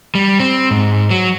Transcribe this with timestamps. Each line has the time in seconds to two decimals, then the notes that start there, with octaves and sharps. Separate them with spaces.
0.15 G3
0.40 C4
0.71 G#2
1.10 F#3